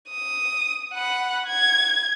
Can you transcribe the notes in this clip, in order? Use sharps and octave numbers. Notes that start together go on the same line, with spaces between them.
D#6
F#5 B5
G#6